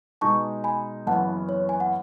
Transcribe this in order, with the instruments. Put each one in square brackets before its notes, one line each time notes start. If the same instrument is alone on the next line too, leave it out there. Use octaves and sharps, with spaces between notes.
[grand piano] B2 G#3 D#4 [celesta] A5 C#6
[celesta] G#5 B5
[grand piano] F#1 F#2 E3 B3 [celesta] F#5 A5
[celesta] C#5
G#5
F#5